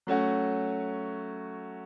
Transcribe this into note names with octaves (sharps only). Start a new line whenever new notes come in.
F#3 A3 C#4 F#4